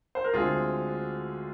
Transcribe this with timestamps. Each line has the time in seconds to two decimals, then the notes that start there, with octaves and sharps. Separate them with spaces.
0.15 C5
0.24 A#4
0.34 D2 D3 G#3 C4 F4 G#4